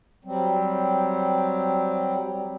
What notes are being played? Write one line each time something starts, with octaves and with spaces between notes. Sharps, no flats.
F#3 G3 C4